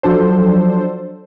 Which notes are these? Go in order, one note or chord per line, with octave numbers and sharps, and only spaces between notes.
F3 F#3 D4 A4 C5